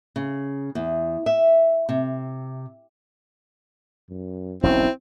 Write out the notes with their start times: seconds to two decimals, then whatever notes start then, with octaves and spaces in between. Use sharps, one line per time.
0.16 C#3
0.75 E2
1.26 E5
1.89 C3
4.10 F#2
4.63 E1 B1 C4 C#4 E4